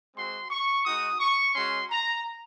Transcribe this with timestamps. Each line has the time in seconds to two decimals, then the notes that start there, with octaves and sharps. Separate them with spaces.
0.15 G#3 C4 F#4 C6
0.50 C#6
0.85 G#3 D#4 F#4 D#6
1.19 C#6
1.55 G#3 C#4 F#4 C6
1.90 A#5